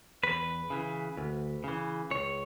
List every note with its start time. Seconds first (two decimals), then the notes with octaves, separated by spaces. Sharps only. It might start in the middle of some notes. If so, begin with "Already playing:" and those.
0.23 E2 B4
0.70 C#3 E3
1.17 D2
1.64 C#3 E3
2.11 C#2 C#5